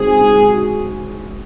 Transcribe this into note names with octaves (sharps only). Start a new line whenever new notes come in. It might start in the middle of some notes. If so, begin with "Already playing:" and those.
Already playing: G#3 C4 F#4 G#4
G#3
F#4